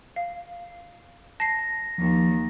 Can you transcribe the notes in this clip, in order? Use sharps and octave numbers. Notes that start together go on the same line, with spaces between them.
F5
A5 A#6 C7
D#2 F3